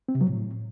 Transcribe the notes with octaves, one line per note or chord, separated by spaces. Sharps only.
C4
C3
F#3
A2